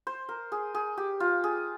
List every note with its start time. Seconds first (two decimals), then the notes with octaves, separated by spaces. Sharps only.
0.07 C5
0.29 A#4
0.52 G#4
0.74 G#4
0.97 G4
1.20 F4
1.44 G#4